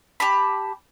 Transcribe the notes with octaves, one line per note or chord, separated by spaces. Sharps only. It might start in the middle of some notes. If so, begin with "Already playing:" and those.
G4 A5 B5